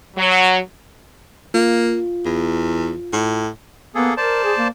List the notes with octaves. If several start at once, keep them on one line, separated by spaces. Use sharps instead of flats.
F#3
A#3 F4
E2
A2
A#3 B3 G#4 A4
A#4 C5 D5 A5
G#4
A#3